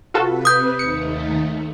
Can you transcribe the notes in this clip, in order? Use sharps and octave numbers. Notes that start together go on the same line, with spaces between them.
C3 F4 F#4 A4 B4
D#6 G6
D#2 A3 D#4 C#7